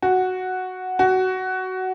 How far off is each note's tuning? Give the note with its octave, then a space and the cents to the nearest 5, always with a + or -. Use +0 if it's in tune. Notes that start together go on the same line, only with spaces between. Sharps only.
F#4 +0
F#4 +15